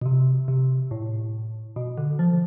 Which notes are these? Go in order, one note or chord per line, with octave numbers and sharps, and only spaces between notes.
B2
C3
C3
A2
B2
D3
F3